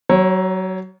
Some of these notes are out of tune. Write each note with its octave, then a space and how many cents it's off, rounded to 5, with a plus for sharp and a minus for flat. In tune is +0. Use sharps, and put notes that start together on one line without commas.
F#3 +25 C#5 -25